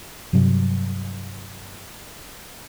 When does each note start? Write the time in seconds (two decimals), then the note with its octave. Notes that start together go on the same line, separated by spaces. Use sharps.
0.33 G2 C3 F#3 G3